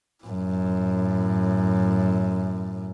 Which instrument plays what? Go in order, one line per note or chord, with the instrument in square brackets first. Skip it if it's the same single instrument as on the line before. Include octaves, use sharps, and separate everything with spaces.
[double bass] F#2 A2